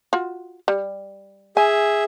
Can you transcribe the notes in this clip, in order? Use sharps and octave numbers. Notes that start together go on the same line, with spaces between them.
F4 F#4
G3
G#4 E5 G#5